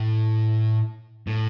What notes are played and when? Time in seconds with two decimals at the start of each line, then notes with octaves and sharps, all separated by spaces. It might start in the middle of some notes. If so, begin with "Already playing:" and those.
Already playing: A2
1.27 A2